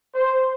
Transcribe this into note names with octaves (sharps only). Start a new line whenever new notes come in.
C5